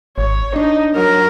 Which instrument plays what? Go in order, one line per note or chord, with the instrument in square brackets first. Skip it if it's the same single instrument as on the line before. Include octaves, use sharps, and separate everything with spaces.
[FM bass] G#1 [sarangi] C#5
[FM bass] D4 [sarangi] D#4
[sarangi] F#3 [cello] A#4